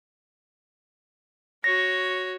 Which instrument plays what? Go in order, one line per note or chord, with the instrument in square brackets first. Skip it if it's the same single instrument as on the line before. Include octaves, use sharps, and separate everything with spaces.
[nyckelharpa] F#4 C#5 [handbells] A#6